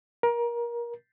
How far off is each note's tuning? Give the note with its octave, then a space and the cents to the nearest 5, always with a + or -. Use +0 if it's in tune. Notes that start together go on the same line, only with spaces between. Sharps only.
A#4 +25